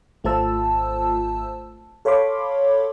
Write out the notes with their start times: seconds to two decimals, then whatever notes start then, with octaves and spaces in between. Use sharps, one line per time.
0.24 G#1 A3 F4 C5 A5 E6
2.05 A4 C#5 F5 B5 C6 D6